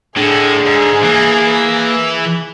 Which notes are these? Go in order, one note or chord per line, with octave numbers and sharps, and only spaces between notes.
A2 D3 G#4
G#2
E3 A#3